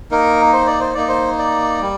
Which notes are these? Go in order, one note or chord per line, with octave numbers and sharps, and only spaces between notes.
A#3 D#4 A#4
C5
D5
C5
A#3 D#4 D5
C5
D5
G3